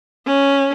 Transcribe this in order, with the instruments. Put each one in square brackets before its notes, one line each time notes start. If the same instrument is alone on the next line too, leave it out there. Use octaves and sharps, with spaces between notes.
[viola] C#4